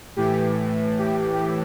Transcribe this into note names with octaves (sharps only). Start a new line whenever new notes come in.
A2 E3 G4
G4